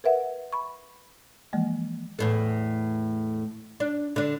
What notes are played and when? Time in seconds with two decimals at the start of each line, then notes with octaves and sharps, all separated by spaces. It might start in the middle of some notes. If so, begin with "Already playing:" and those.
0.04 A#4 B4 E5 F#5
0.53 B5 C#6
1.53 E3 F3 G#3 A#3
2.19 E2 A2 A4
3.80 D4
4.16 D3 D4